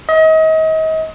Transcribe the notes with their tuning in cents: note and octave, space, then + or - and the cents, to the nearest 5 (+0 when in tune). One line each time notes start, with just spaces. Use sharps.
D#5 +35